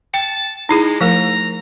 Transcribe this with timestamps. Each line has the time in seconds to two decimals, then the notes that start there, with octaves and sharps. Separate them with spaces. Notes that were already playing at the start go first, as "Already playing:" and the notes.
0.14 G5 A5
0.69 G#3 D#4 E4 G#4
1.01 F3 A3 A#4 A#5